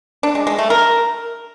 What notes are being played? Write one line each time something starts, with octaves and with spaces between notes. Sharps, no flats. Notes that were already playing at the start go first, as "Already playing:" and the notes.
D4
G#3
G#3
A3
A#4